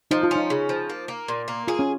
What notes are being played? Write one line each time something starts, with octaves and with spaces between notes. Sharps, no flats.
F3 D#4
F4
C#4 D#4
C#3
F3
A#3
A#3
A#2
A#3
F4 G#4
C#4